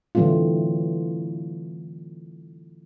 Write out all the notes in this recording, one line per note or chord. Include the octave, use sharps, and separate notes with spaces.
D3 E3 F#3 A3 C4 F4